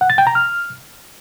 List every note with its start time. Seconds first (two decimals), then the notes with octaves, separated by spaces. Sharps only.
0.01 F#5
0.10 A6
0.18 G5
0.27 A#5
0.35 F6